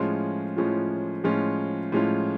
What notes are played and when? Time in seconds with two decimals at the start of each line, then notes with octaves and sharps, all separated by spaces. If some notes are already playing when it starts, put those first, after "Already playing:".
Already playing: A2 F3 G#3 C#4 F4
0.57 A2 F3 G#3 C#4 F4
1.24 A2 F3 G#3 C#4 F4
1.92 A2 F3 G#3 C#4 F4